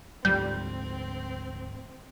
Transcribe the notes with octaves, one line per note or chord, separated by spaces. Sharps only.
D2 G#2 F3 G3 C4 G6